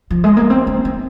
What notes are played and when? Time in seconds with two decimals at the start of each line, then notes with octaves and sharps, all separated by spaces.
0.11 F3
0.24 G#3
0.37 A#3
0.50 C4
0.67 D#4
0.85 C4